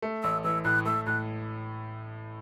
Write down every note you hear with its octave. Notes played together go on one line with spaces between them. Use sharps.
A3
A1 E6
E3 E6
A2 F#6
A3 E6
A2 F#6